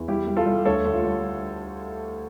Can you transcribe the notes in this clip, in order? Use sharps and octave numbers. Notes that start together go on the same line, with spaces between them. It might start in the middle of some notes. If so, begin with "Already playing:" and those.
Already playing: E2
G3 E4 G4
G3
F4 A4
G3
D2 A4 C#5
D2
F4
G3